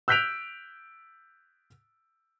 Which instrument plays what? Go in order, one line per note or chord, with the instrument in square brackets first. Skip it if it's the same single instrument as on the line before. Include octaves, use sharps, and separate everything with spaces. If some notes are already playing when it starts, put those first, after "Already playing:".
[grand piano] E6 F#6 G6 B6 D7 F7